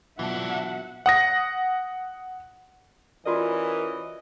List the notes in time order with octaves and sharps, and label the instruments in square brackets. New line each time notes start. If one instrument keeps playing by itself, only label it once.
[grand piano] B2 F#3 F4 [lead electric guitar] E3 D4 [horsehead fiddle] E5 F#5
[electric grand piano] F#5 D#6 A#6
[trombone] E3 [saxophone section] C#4 D#5 [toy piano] F4 F#4 D5 [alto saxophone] A#4